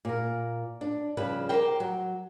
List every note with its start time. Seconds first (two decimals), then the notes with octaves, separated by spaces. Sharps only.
0.05 A#2 A#4
0.81 D4
1.17 C#3 F3 G3 B4
1.49 G4 A#4 C5 G5
1.80 F#3